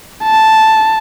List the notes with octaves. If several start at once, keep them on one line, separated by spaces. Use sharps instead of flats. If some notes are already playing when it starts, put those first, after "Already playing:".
A5